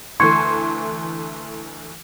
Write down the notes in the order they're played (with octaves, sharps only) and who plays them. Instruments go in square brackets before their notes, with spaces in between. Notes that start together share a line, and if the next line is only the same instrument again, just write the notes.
[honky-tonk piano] D2 E3 A3 [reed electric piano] C6 [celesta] C#6 G#6 C#7